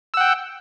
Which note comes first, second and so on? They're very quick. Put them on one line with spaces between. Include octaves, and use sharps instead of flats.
E6 F#5 G5